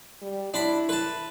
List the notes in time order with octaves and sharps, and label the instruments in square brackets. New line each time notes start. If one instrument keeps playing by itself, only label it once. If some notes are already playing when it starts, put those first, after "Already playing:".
[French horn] G3
[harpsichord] D4 B5 [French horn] E4
[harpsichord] B4 A5